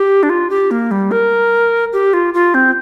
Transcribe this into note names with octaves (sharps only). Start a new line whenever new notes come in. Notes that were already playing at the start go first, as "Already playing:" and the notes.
Already playing: G4
D4
F4
G4
A#3
G3
A#4
G4
F4
F4
C4